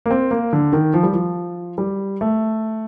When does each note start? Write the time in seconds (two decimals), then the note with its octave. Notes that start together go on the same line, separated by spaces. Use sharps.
0.06 A#3
0.11 C4
0.31 A#3
0.53 D3
0.73 D#3
0.94 F3
1.03 G3
1.13 F3
1.78 G3
2.21 A3